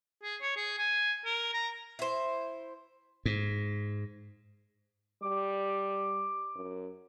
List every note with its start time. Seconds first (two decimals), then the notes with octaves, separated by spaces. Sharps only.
0.23 G#4
0.42 C#5
0.57 G#4
0.79 G#5
1.25 A#4
1.53 A#5
1.99 E4 C5
3.26 G#2
5.23 G3 D6
6.55 F#2